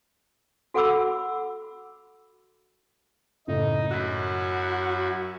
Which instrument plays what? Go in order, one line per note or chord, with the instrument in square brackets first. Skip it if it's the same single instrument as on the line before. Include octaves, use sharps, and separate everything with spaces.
[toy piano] F#4 A4 F#5 B5 D6 E6
[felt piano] F#1 A2 D#5 [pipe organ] D#4
[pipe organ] F#2 E4 [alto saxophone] F#4 [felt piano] F#6 B6